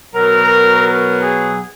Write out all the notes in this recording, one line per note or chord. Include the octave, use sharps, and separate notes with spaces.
B2 F#3 A#4
A#4
G#4